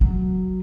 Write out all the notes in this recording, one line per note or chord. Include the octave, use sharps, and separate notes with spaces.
F#3